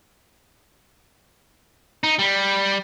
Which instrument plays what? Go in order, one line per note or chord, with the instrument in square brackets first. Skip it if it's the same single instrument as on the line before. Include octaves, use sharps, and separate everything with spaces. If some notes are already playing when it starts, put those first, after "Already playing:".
[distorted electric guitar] D#4
G3